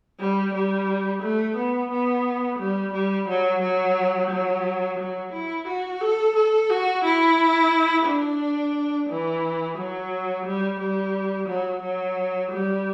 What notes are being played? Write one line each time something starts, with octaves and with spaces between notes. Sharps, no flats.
G3
G3
A3
B3
B3
G3
G3
F#3
F#3
F#3
F#3
E4
F#4
A4
A4
F#4
E4
D4
E3
F#3
G3
G3
F#3
F#3
G3